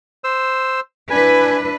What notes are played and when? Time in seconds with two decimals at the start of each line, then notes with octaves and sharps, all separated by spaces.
0.24 C5 E6
1.11 D4 E4 B4 G#5